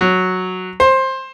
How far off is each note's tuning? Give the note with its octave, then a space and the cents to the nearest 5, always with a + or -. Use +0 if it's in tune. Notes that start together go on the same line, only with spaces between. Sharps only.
F#3 -5
C5 +15